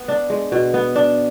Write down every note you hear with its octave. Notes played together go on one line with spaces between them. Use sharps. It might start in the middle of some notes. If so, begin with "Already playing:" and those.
Already playing: B3
D4
G#3
B2
B3
D4